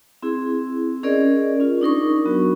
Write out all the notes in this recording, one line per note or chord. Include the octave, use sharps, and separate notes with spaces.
C4 E4 G#4
C#4 G#4 A#4 D5 D#5
C#4 F4
D4 D#4 A#4 C#6
F#3 B3 F#4